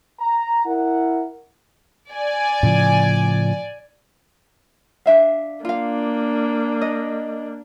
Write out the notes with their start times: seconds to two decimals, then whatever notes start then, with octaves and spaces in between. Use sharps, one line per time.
0.20 A#5
0.66 E4 A#4 F#5
2.11 D5 G#5
2.63 A2 C#3 F3
5.06 D4 E5 F5
5.65 A#3 D4 F4 F5
6.81 D#5